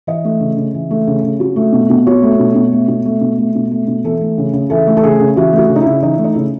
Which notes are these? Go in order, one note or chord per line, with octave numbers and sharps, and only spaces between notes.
E3 D#5
A3
C#3
C#3
E3
A3
C#3
C#3
F#3
A3
B2
B2
F#3 C#5
A3
B2
B2
A3
B2
A3
B2
A3
B2
A3
B2
E3 A4
A3
C#3
C#3
E3 A4
A3
A4
C#3 G#4
C#3
E3 F#4
A3
F#4
C#3
D#4
E4
C#3
E3 D#4
E4
A3
D#4
C#3 E4